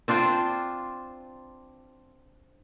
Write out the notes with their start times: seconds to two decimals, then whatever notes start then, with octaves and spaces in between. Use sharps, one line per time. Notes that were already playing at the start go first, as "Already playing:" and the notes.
0.08 C4 D4 F4 C5